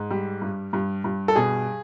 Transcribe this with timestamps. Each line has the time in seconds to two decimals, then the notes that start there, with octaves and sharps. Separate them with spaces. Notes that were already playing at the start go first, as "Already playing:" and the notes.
Already playing: G#2
0.10 G3
0.42 G2
0.73 G2
1.04 G2
1.28 A4
1.36 B2 G#4